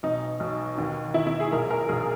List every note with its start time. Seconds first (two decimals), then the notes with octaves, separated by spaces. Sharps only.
0.03 B1 B2 D#4
0.40 B1 B2
0.78 D#2 D#3
1.14 D#2 D#3 E4
1.27 E4
1.40 G#4
1.52 B1 A#2 A#4
1.71 A#4
1.89 B1 A#2 G#4